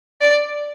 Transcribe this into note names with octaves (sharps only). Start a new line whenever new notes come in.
D5